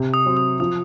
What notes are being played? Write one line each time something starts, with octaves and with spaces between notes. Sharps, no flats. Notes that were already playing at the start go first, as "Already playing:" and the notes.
Already playing: C3
D#6
F#3 C4
D#6
F3 D#6